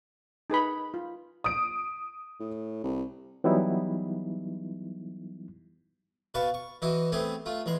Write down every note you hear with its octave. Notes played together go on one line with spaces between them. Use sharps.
D#4 G#4 B4 B5
F4
D#6 D7
A2
C2
E3 F#3 G3 B3 D#4 E4
B2 B4 F5 A5 C#6
C#6
E3 D#4 E4 F#4
A3 B3 C4 G4 G#4
A3 F4
E2 G#3 C6